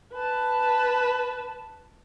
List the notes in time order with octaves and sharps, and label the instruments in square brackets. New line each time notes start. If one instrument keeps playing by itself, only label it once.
[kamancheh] B4 A5